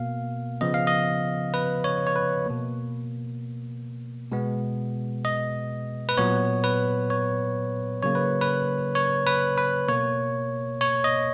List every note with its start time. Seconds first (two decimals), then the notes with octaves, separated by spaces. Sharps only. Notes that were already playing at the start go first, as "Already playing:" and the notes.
Already playing: B2 A#3 F5
0.61 C#3 F3 B3 D#5
0.74 F5
0.87 D#5
1.54 B4
1.84 C#5
2.07 C#5
2.16 B4
2.46 B2 A#3
4.31 B2 G#3 B3
5.25 D#5
6.09 B4
6.17 A#2 F#3 B3 C#5
6.64 B4
7.10 C#5
8.03 C#3 F#3 A#3 C#5
8.15 B4
8.41 B4
8.95 C#5
9.26 B4
9.58 B4
9.88 B2 A#3 C#5
10.81 C#5
11.04 D#5